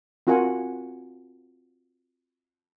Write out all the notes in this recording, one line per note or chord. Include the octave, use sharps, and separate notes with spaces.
C4 F4 F#4 A#4 F#5 G#5